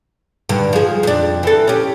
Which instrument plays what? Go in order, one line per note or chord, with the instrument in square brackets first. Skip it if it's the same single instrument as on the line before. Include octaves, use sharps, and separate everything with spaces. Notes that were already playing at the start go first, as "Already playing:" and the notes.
[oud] G2 D3
F3 G#4
F2 D4
E3 A4
C#4 G4